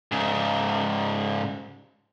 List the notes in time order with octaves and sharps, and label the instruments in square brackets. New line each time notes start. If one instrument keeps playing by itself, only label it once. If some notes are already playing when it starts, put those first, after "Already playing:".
[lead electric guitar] G#2 C#3